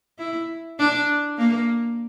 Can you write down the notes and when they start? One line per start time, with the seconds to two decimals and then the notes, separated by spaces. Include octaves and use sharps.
0.19 E4
0.79 D4
1.38 A#3